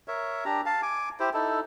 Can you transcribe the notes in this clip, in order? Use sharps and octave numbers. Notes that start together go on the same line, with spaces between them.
A#4 C#5 E5
D4 G4 A#5
F5 A5
G#5 D6
E4 G4 C5
D#4 E4 A4